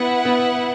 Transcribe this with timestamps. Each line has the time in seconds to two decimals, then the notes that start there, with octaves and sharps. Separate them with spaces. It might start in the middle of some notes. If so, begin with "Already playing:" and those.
Already playing: B3 E4 B4 F#5
0.25 B3